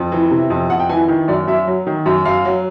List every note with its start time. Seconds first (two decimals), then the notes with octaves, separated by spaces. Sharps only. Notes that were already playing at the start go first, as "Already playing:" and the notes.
Already playing: F2
0.12 E3
0.31 C3
0.50 F2
0.70 F2 F#5
0.80 G5
0.89 E3 G#5
1.08 D#3
1.28 F#2 D5
1.47 F#2 E5
1.67 F#3
1.87 D#3
2.06 F#2
2.25 F#2 F5
2.45 F#3